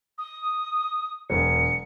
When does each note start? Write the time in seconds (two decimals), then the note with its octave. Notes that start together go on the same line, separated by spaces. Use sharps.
0.18 D#6
1.30 E1 F#3 C#7